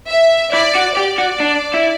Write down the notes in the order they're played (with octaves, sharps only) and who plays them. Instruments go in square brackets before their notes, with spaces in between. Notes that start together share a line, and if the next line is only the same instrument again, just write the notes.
[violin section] E5
[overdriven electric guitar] E4 [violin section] D5
[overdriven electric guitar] F#4
[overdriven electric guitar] G4 [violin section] D5
[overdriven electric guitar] F#4
D4
E4